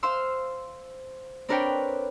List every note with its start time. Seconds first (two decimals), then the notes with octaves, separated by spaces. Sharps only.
0.03 C5 F5 C6 E6
1.49 C4 D4 A#4 B4 C#5 G5